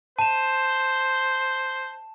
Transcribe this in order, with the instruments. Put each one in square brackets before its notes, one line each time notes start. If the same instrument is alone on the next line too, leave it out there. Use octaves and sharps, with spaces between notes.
[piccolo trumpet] C5 [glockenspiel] A5 E7